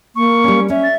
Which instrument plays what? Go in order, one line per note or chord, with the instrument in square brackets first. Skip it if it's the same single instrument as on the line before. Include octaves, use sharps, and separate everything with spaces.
[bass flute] A#3 [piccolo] C#6
[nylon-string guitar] G3 C#4
[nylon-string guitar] C#4 [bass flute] E5
[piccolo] A6